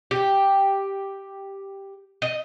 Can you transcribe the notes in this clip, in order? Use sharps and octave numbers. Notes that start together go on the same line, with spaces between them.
G4
D#5